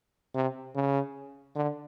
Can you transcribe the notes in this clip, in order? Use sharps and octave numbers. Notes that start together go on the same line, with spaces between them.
C3
C#3
D3